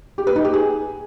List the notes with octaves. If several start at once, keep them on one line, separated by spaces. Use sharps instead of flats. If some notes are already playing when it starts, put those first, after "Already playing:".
G4
B4
D#4
G4
G#4